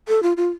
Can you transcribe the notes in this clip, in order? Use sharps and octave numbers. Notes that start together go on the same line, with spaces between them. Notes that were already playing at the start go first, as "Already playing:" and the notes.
A4
F4
F4